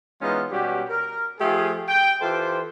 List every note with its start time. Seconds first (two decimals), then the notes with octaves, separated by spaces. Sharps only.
0.22 E3 G#3 B3 C#4 D#4 F4
0.51 B2 G3 C#4 F#4 G4
0.89 A#4
1.40 F3 A3 F4 G4 G#4
1.89 G5
2.22 E3 F4 G4 A4 C5